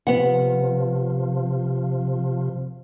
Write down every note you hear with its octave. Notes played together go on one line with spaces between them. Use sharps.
C3 F3 B3 F#5